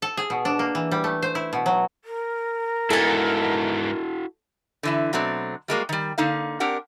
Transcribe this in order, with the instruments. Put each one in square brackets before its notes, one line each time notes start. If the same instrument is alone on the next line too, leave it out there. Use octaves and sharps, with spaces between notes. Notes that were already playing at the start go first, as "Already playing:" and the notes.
[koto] A4
G#4
B2
D4
A#3
E3
G3
A3
C5
E4
B2
F#3
[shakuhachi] A#4
[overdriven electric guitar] G#2 B3 [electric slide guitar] E4 F#4 [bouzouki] A4 G#5
[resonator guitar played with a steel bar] D3 E3 E4
B2 F#3 A3 C4 D4
G3 G#3 A#3 F#4
D#3 G3
D3 A#3 D#4 F5
C4 D4 G4 A#4 F#5